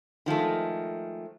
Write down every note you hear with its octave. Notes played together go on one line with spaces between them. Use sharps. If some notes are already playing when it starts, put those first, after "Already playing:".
D#3 F3 G#3 A3